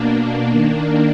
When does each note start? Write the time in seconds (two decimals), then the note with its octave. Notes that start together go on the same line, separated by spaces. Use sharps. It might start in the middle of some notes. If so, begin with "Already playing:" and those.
Already playing: B2 A#3 D4
0.49 D#3 A#3 D4